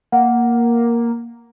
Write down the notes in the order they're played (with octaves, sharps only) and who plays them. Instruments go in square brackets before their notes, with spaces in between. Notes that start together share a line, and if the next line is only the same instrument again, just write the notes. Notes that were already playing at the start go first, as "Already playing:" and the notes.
[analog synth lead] A#3 [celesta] F#5